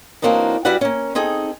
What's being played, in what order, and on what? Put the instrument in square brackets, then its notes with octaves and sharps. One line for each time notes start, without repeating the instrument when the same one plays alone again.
[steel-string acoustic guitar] E3 F#3 A#3 C4 D4 D#4
G3 E4 F#4 B4 D5 F#5
A#3 C#4
C4 D#4 G#4 A4